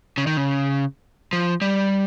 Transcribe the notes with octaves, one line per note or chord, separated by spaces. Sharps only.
C#3
D#3
C#3
F3
G3